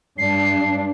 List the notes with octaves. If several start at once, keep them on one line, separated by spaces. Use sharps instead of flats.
G2 D4 C7